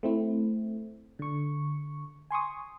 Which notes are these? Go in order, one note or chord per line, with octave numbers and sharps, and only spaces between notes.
A3 C4 E4
D3 C#6
G#5 C6 C#6 D#6